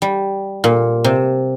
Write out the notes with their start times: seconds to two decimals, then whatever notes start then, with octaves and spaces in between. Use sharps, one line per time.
0.02 G3
0.64 A#2
1.04 C3